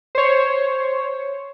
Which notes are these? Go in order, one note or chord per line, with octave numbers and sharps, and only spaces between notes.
C5 C#5